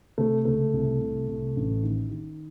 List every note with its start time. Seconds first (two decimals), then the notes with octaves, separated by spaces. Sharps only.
0.18 C3 A3
0.45 C#2 A3
0.74 C2
1.01 C2
1.28 C2
1.56 A1
1.83 D#3
2.11 D#3